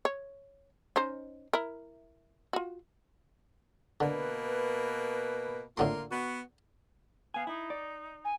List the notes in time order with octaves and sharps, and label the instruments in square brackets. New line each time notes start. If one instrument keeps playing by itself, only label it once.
[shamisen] C#5
C#4 D#4 C5
E4 A#4
F4 F#4
[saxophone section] B2 A#3 B4 [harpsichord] D3
[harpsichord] A2 D3 C6 [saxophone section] A#3 F4
[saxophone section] B3 F#4
[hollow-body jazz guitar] B3 G#5 [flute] F5
[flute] D#4 [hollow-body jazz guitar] E4
[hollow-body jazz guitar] D5
[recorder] G#5